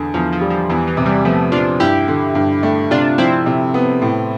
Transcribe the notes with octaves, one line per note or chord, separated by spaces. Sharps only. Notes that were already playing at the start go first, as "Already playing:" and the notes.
Already playing: E2 D3
E2 F3
F3
G3
F3
E2 E3
E3
C3
E3 G3
F3 A3 B3
F3 D4 F4
G2 E4 G4
D3
G2
A3
C3 D4 F4
F3 C4 E4
C3
B3
A2